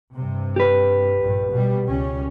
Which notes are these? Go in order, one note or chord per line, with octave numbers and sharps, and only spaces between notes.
G2 C3
G4 B4
A#1 G2
B2 G3
C#2 G3 C#4